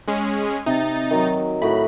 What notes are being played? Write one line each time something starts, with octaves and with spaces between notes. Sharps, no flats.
G#3 C#4 G#4
C3 D#4 A6
D#3 F#3 D#5
A2 F#4 B5